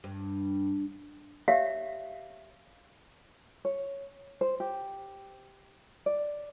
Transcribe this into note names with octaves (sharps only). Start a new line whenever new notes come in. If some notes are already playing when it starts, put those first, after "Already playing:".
G2
G4 C#5 E5 F5
C#5
C5
G4
D5